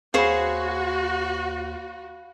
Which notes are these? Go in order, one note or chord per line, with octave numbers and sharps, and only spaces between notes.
D#2 F#4 G#4 C5 C#5 F5 B5